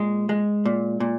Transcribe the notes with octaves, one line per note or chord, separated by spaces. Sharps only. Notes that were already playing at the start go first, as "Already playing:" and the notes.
Already playing: A#2 G#3
G#3
A#2
A#2